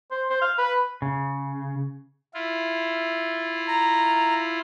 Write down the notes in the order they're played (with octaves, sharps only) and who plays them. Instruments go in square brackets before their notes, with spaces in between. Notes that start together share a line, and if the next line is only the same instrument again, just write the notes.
[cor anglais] C5
C5
F5
B4
[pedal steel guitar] C#3
[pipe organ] E4 F4
[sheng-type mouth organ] A#5